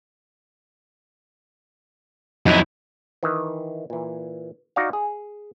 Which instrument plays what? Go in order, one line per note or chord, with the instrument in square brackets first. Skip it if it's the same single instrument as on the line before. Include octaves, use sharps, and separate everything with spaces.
[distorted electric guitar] F2 E4 [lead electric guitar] F#3 D#4
[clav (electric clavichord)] D#3 E3
A#2 E3
D#4 F#4 D5 D#5 F5
G#4